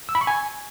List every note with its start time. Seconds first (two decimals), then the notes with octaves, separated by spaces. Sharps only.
0.09 E6
0.15 B5
0.21 C#6
0.27 G#5